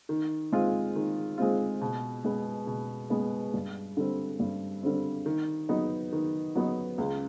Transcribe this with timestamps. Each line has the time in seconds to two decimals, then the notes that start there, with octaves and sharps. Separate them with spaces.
0.09 D#3
0.52 G#3 C4 F4
0.95 D#3
1.38 G#3 C4 F4
1.81 B2
2.24 G#3 B3
2.67 B2
3.10 G#3 B3
3.54 G2
3.97 D3 G3 C4
4.39 G2
4.83 D3 G3 C4
5.26 D#3
5.69 F#3 B3 D#4
6.12 D#3
6.55 F#3 B3 D#4
6.98 C#2